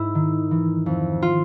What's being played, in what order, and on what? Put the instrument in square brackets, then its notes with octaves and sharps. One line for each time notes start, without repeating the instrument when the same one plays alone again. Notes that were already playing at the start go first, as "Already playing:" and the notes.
Already playing: [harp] G#2 E4
D#3
E3
F2
F4